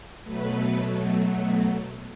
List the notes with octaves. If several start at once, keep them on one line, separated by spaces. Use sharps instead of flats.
B2 F#3 A3 B4